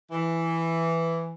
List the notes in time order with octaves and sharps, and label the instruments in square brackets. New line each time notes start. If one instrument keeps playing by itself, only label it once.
[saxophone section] E3